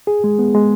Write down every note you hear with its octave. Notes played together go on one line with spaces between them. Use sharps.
G#4
G#3
B3
G#3